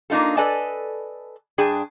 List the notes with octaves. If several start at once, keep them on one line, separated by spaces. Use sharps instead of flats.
A#3 D4 D#4 F4 A4
A4 B4 D5 D#5 G#5 A5
G2 D4 G#4 G5 A5